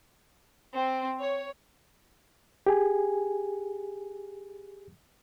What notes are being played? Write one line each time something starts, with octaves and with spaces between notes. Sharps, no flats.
C4
C#5
G4 G#4 G#5